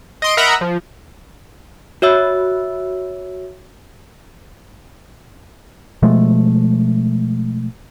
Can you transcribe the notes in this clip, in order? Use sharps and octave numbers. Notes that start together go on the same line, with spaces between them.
D#5 C6 D7
A#4 D#5 E5 F#5 A#5 B5
F3
F#4 C#5 E5 E6
B2 F3 G#3 A3